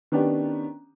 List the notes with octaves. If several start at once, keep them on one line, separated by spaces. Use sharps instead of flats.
D#3 B3 C#4 D4 G4